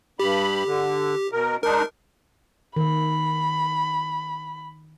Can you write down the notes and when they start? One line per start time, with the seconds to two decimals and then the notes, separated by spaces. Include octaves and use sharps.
0.20 G2 G4 B5
0.66 D3
1.32 B2 A#4
1.63 G#3 D4 D#4 A#4
2.76 D#3 B5